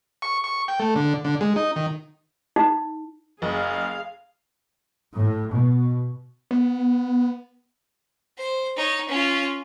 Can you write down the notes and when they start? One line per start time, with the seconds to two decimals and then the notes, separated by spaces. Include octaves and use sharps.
0.22 C#6
0.44 C#6
0.68 G5
0.80 A3
0.96 D3
1.25 D3
1.41 G#3
1.56 D#4
1.76 D#3
2.56 D#4
3.42 F#1 G#4 F5
5.14 A2
5.52 B2
6.51 B3
8.38 C5
8.76 D#4 C#5
9.08 C#4 F4